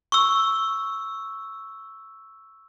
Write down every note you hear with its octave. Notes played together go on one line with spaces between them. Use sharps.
C#6 E6